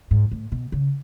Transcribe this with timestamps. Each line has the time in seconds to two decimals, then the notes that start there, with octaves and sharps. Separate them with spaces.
0.11 G#2
0.31 A2
0.52 B2
0.72 C#3